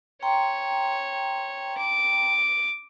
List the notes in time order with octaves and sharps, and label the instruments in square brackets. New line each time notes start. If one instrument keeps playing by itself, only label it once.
[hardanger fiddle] C#5 [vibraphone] G5 A#5 C6
[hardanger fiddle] D6